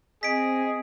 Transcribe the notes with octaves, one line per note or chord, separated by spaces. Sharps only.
C4 G#4 D#5 B6 D7